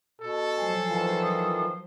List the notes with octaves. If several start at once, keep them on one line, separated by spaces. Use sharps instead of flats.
B2 A4
F3 F#3 C5 G#5
D#3 E3 F4
D#6